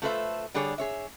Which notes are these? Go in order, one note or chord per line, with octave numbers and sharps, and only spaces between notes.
A3 F4 A4 B4 C5 E5
D3 G3 D4 G#4 C#5
G#4 C#5 E5